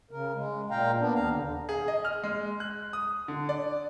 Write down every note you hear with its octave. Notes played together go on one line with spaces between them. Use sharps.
C#3 A#4
G#3
A#2 F5 G5 A#5
A#3 B3 D4
D#2 F5 A#5
D3
G#4
D#5
F6
G#3
F#6
D#6
D3
D5